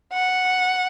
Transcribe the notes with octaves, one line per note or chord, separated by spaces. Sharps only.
F#5